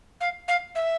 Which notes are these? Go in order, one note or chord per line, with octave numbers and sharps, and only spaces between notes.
F5
F5
E5